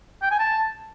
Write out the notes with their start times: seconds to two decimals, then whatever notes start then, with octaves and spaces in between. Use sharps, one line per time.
0.22 G5
0.31 G#5
0.40 A5